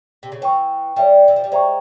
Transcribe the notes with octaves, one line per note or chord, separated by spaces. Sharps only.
C3
C#3
E3 C#5 G5 C#6
G3 C#5 E5 G5
E3
F3
G3
G#3 C5 E5 G5 A#5 C#6